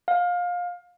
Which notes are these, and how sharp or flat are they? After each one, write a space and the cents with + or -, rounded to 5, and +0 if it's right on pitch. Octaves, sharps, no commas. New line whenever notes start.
F5 +25